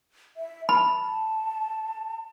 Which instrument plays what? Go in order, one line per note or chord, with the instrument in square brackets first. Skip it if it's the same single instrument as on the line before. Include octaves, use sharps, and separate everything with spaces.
[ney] E5
[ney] A5 [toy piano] B5